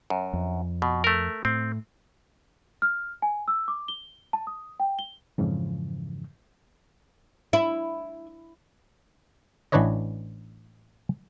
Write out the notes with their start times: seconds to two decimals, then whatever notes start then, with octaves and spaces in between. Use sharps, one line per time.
0.10 F#2
0.33 F2
0.82 B2
1.04 A3 A#4
1.45 A2 C4
2.82 F6
3.22 G#5
3.48 E6
3.68 D6
3.88 G7
4.33 A5
4.47 D#6
4.80 G5
4.99 G7
5.38 F2 G#2 C#3 E3 F3
7.53 E4
9.72 A1 E3 D4 B4 C#5 D#5